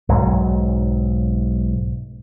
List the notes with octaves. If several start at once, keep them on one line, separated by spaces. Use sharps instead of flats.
B1 G#2 F#3